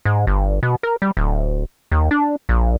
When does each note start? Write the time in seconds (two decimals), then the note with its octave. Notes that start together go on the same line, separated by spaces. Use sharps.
0.05 G#2
0.27 G1
0.63 B2
0.83 A#4
1.02 G3
1.17 D1
1.92 D#2
2.11 D4
2.49 A#1